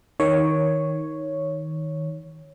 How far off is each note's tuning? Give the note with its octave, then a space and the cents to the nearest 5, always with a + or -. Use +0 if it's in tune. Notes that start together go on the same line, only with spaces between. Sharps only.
D#3 +15 C#5 +0